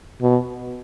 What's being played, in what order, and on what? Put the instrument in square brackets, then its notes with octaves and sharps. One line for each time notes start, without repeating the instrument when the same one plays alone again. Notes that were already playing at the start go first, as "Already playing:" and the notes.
[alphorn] B2